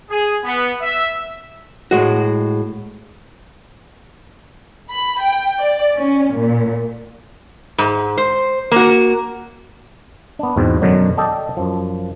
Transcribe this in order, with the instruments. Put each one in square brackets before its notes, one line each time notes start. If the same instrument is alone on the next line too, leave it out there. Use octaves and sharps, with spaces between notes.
[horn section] G#4
B3
E5
[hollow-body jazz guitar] A2 G#3 F#4
[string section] B5
G5
D5
C#4
A#2
[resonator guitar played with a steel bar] G#2
C5
A#3 F#4
[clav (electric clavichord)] B3 D4
E2 G#2 B2 C4
F#2 B2 D3 F#3
A4 D5 D#5 G5 A5
F#2 F3